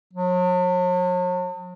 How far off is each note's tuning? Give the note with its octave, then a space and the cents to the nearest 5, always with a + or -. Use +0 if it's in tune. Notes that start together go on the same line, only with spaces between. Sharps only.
F#3 -45